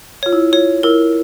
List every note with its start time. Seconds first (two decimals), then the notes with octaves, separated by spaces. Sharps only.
0.23 F4 C#5
0.33 E4
0.53 F4 C#5
0.83 E4 A#4